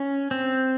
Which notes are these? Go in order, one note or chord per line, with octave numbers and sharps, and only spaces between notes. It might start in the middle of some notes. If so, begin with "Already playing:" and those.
Already playing: C#4
C4